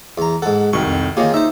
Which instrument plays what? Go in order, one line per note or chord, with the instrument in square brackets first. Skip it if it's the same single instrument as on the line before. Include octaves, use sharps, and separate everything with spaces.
[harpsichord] E2 A#5
[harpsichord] G#2 A4 [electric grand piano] F#5
[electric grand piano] C2 D#3 G5 [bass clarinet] F#4 [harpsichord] C#6
[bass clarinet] F2
[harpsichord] D#3 G4 [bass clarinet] A#3 [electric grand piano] F4 G#4 C#5
[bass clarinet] D#4 [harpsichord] C5 E5 [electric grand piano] E6